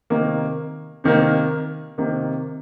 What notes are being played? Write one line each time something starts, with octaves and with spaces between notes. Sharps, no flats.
C3 D#3 A#3
C3 D#3 A#3
C3 D#3 A#3